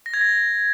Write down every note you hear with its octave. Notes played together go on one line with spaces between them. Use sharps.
A#6
G#6
A#6